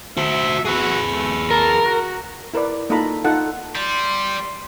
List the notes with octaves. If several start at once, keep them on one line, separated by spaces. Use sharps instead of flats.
F#4 C5 E5
F#4 G#4 B4
A3
A#4 A5
F#4
E4 A#4 B4 D5
A#3 D#4 F4 A4 A#5 B5
D#4 F4 A4 F#5
G3 C6